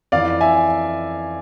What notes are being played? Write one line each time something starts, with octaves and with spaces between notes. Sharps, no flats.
F2 E3 D5 F5
E5 G#5